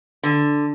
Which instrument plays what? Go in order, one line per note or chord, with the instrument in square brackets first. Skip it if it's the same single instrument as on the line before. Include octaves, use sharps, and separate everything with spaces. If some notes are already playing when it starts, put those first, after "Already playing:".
[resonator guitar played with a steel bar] D3